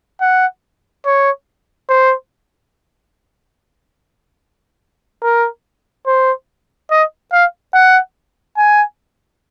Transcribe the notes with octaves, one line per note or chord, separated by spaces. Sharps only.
F#5
C#5
C5
A#4
C5
D#5
F5
F#5
G#5